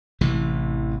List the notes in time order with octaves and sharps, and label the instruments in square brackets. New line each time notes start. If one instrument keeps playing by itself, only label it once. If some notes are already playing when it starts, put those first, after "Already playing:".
[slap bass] A1 C3 E3